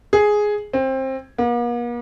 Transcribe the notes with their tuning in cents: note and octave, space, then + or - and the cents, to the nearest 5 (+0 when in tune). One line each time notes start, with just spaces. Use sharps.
G#4 +5
C4 +20
A#3 +45